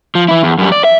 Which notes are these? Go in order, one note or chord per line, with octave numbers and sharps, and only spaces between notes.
F3
E3 E4
E2
F#2 G3
D5
E5